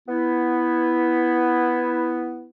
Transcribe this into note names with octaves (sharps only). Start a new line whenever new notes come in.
B3 E4